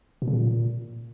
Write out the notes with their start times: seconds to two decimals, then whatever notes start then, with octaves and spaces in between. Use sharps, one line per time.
0.22 B2
0.28 C#3
0.33 A#2